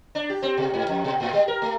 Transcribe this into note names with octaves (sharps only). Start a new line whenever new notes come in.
D4
G4
C4
B2
G#2
F2
B2
A2
G3
A#4
A3